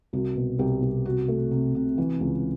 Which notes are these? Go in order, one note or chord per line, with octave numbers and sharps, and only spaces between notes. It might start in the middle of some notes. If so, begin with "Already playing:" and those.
C2 F#4
B2
C2 G4
C2
C3 F#4
A3
C3
C3
E3
C#2